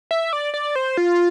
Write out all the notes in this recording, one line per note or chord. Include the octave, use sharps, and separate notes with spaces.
E5
D5
D5
C5
F4